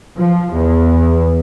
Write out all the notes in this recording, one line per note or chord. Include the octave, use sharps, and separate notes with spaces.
F3
E2